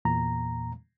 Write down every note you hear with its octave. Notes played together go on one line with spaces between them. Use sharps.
E2 A#2 A#5